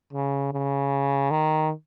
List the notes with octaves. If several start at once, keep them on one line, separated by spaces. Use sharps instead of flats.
C#3
C#3
D#3